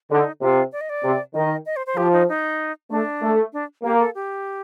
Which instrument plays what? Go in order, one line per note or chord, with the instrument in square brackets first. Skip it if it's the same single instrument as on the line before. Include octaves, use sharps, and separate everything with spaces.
[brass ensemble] D3 [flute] D#4
[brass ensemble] C3 [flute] F4
[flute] D5
D#5
D5
[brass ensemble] C3
[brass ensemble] D#3 [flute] D#5
[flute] D#5
C5
C5
[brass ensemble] F3 [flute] G4
[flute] D#4
D#4
[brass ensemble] A3 [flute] D4
[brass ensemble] A3
[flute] D4
[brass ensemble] A#3 [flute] G4
[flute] A4
G4